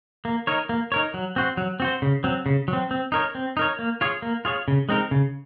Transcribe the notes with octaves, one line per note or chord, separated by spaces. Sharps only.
A#3
D#4 A#4 C#5
A#3
D#4 A#4 C#5
F#3
C4 F#4 C5
F#3
C4 F#4 C5
C#3
F#3 C4
C#3
F#3
C4
C4
D#4 A#4 C#5
C4
D#4 A#4 C#5
A#3
F4 G#4 C#5
A#3
F4 G#4 C#5
C#3
G#3 C4 D#4 A#4
C#3